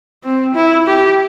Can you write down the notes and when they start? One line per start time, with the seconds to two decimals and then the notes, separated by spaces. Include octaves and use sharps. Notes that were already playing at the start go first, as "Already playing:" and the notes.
0.24 C4
0.54 E4
0.87 G4